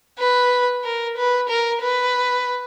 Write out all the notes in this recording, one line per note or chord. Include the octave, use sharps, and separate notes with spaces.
B4
A#4
B4
A#4
B4